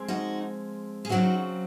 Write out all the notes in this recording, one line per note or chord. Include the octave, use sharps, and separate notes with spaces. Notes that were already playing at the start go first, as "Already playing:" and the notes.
Already playing: F3 G#3 C4
D#4 F#4
G#4
C#3 F#3 C4 D#4 F#4